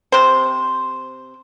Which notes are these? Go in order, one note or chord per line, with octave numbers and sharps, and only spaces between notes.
C3 C5